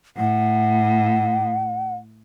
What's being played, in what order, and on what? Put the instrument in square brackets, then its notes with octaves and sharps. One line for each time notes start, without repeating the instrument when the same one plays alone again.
[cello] A2 [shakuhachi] F#5